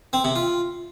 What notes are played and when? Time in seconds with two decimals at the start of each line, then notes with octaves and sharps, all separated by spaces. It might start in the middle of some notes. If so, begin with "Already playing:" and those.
0.13 C4
0.24 C3
0.35 F4